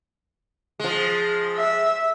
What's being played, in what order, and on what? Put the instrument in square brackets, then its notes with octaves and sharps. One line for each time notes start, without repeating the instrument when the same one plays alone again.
[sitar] F3 G#3
[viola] E5